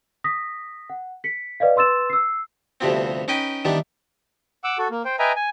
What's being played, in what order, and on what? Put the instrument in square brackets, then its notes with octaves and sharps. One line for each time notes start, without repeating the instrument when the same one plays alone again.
[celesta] D#6 A#6 B6
F#5
B6 C#7
B4 D5 D#5 F5
B4 C6 E6 A6 E7
E6 C7
[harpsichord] D2 G2 C3 F3 B3 C4
C#4 D#4 B4 G5 G#5
D#3 E3 G3 B3 D4
[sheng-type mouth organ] F#5 D6 E6
F#4 A4
A#3
C5 G5
B4 D#5 E5 G5 G#5 A#5
G#5